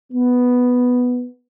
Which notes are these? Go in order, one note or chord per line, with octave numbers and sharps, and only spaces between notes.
B3